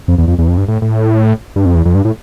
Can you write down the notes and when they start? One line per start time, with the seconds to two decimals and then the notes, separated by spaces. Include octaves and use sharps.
0.08 F2
0.18 E2
0.28 F2
0.38 E2
0.48 F2
0.57 G2
0.68 A2
0.82 A2
1.56 G2
1.65 F2
1.75 E2
1.85 F2
1.95 G2
2.05 A2